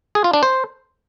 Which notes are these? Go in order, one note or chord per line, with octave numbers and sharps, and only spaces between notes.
G#4
F4
D4
C5